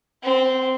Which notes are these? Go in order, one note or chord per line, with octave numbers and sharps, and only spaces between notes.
C4